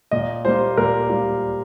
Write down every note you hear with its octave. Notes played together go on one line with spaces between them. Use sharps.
A#2 D#5
G3 A#3 C5
A#2 A#4
G3 A#3